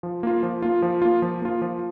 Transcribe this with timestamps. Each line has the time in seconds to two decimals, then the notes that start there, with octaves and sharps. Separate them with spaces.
0.03 F3
0.23 A#3 F4
0.43 F3
0.62 A#3 F4
0.82 F3
1.02 A#3 F4
1.22 F3
1.42 A#3 F4
1.62 F3